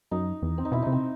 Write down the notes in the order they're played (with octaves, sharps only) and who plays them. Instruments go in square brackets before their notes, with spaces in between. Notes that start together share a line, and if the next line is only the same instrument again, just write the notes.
[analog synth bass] F#2 [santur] D#4
[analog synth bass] E2
[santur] C4
D#4
[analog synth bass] B2 [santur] E4
[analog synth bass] C3 [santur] D#4
[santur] C4